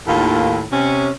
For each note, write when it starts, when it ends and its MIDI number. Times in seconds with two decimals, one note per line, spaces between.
0.07 0.64 39
0.07 0.64 45
0.07 0.64 51
0.07 0.64 58
0.07 0.64 65
0.72 1.09 48
0.72 1.09 61